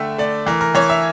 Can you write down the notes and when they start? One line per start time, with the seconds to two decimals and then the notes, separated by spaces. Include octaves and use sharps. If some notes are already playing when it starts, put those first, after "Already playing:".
Already playing: D3 A3 E5 G5
0.18 A3 D5
0.46 E3 A#4
0.61 A#4
0.75 E3 C#5
0.90 E5